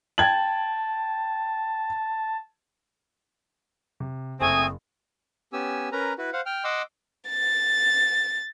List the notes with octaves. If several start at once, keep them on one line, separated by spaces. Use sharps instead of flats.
G5 A5 G#6 F#7
C3
F#1 A3 C4 G#5 C#6 D#6
B3 C#4 G4 G#5 E6
C#4 A#4 B4 A#5
E4 F#4 B4
C5 F5 F#5
G5 F6
D#5 F#5 C6 D6 E6
A6